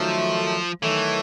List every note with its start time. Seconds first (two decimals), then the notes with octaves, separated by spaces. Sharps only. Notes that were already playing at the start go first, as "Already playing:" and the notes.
Already playing: D#3 F3 F#3 A3
0.83 D#3 E3 F#3 A3